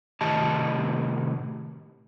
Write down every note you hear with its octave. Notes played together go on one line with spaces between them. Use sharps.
A2 C3 D#3 G4 D#5 A5